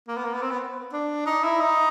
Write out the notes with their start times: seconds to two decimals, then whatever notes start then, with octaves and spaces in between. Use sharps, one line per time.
0.08 A#3
0.17 B3
0.25 A#3
0.34 B3
0.42 C4
0.51 B3
0.93 D4
1.26 D#4
1.44 E4
1.60 D#4